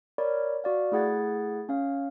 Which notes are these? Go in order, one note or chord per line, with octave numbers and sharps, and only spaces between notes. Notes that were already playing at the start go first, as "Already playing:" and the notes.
A#4 C#5 D5 E5 B5
F#4 D5 F5
A3 E4 G#4 F#5 G#6 A6
C#4 C#5 F5